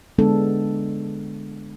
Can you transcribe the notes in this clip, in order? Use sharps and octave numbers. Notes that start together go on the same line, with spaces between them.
D3 G#3 B3 D4 A4